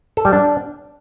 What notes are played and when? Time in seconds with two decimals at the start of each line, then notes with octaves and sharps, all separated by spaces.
0.17 A4
0.25 G3
0.33 D4